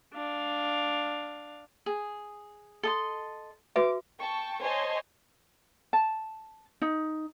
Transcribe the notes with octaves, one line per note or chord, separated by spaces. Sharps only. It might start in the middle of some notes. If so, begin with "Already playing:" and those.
D4 F5
G#4
A4 D#5 C6
F#4 B4 E5 D6
G5 A5 C#6
C5 C#5 D#5 G#5 A5 C6
A5
D#4